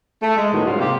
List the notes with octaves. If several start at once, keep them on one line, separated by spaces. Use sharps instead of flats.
A3
G#3
A2 D#3 F#3 G#3 B3
G#2 C#3 F#3 G3 F4
G#2 C3 A#3 G4